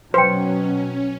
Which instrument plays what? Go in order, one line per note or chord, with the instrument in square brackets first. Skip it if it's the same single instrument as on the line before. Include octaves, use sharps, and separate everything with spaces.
[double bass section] B2 F#3 [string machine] C#4 [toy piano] B4 G5 [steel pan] C5